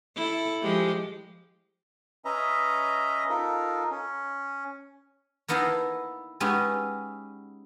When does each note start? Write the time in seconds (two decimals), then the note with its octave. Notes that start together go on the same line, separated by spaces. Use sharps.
0.16 E4 A4
0.62 F3 G#3 G4
2.25 C#4 B4 D#5 E5 A#5
3.29 D#4 F4 A4 A#4
3.91 C#4
5.48 A#3 B3 D#4 E4 A4 F5
6.40 G#3 B3 C#4 D#4 G4 E5